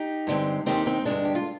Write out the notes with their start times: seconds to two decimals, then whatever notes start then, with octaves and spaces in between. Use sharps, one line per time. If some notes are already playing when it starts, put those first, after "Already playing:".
Already playing: D#4 G4
0.27 G2 D3 G#3 C4
0.66 D#2 D#3 G#3 C4 D#4 G4
0.86 C4 D#4
1.05 G2 D3 G#3 D4
1.25 G4
1.35 F4